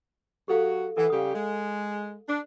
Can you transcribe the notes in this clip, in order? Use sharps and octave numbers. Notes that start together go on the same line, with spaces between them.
F#3 F#4 G4 A4 F5
E3 A4 F#5
C#3 G3 G4 F5 D#6
G#3
D4